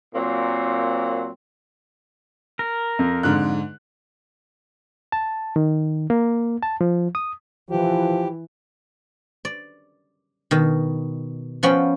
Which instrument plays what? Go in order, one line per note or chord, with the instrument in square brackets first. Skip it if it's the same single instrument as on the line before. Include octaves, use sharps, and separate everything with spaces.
[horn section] A#2 F#3 A#3 C4
[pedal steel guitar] A#4
[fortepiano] F2
[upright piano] G#2 D3 F#6
[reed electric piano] A5
D#3
A#3
A5
F3
D#6
[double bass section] E3 [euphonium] F3 [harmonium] G4
[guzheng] D5
B2 D#3
F3 B3 C#4 F#4 G5 B5